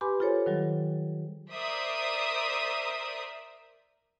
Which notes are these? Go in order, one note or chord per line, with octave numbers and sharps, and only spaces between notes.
G4 B4 G#5 B5 C6 D6
F4 G#4 A4 C5 C#5
D#3 F#3 G3
A#4 C5 D5 E5 D#6